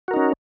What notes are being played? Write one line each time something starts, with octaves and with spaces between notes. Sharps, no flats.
C#4 D#4 F#4 A#4